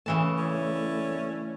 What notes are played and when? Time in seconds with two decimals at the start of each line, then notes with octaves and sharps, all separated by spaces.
0.06 C#3 E3 A3 A5
0.38 C#4 D4 E4